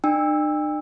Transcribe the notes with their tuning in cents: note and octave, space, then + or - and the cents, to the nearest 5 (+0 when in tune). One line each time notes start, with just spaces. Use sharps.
D4 +45 G5 +40 E6 +0